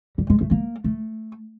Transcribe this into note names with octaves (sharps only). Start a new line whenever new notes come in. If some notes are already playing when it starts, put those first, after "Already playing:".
G3
G#3
A3
A#3
A3